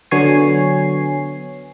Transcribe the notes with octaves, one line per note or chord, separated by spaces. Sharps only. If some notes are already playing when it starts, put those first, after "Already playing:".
D3 F#3 B3 C#5 G#5 C7